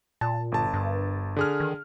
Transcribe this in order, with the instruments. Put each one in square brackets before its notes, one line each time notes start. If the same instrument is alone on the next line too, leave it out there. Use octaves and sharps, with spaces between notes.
[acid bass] A#2 [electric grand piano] A5
[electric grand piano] G1 A5
[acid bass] G2
[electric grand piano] D3 G#4 F6
[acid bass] D#3